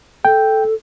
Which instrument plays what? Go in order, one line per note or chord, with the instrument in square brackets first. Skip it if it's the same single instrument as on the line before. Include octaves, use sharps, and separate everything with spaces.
[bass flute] A4 [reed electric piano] G5